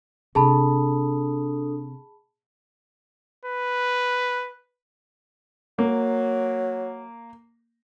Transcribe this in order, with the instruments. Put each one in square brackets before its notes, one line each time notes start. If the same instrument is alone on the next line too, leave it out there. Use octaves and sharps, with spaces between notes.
[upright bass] C3 [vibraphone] D4 A4 D#6 [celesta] G#4 A5 B5
[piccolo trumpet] B4
[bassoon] F#3 [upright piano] A#3